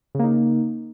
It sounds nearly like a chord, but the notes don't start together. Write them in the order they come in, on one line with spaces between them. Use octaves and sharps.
C#3 A#3 D#4